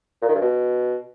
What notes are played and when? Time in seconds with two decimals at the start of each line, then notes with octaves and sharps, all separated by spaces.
0.22 A#2
0.29 D#3
0.35 G2
0.42 B2